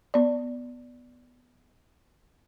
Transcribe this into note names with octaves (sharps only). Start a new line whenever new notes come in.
B3 D5